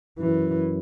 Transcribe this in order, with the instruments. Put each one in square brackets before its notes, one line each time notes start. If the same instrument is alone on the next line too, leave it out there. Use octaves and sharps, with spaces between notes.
[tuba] F#2 [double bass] E3